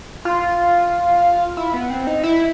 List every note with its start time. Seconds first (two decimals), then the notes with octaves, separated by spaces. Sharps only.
0.25 F4
1.57 E4
1.74 B3
1.90 C4
2.07 D#4
2.24 E4